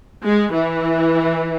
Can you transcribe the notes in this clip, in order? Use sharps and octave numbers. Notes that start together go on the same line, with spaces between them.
G#3
E3